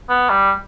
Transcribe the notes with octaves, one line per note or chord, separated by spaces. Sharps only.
B3
G3